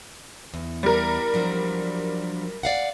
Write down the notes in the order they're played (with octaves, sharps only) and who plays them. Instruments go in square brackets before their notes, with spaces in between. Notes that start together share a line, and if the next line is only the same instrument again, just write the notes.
[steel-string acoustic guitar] E2
[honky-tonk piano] G3 A#4
[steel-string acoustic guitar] F3 F#3 D4
D5 F5 F#5